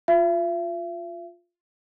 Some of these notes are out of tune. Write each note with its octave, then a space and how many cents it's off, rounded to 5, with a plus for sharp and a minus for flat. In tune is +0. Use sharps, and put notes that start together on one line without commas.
F4 +5 E5 +45